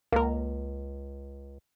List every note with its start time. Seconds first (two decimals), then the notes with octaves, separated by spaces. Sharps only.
0.12 C#2 A#3 A#4